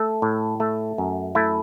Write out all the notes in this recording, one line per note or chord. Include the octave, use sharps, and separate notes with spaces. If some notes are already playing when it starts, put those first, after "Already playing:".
Already playing: A3 A4
A2
A3
F#2
A3 E4